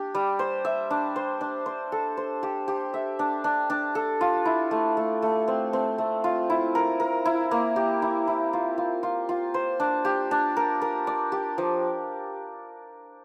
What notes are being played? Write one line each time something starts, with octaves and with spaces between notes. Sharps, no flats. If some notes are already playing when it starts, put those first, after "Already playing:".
Already playing: D4 G4
G3
C5
E5
D4
C5
D4
C5
A4
C5
G4
G4
E5
D4
D4
D4
A4
F4
E4
A3
A3
A3
C4
C4
A3
F4
E4
A#4
A#4
E4
A#3
G4
E4
E4
F4
F4
F4
F4
C5
D4
G4
D4
A#4
A#4
D5
G4
F3